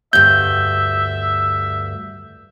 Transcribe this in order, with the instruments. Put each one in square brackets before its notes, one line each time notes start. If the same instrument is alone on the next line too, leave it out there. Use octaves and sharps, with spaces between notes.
[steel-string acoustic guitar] D2 G2 [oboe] E5 [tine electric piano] G6